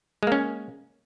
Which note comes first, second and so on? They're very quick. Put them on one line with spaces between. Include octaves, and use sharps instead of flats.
G#3 A#3 C#4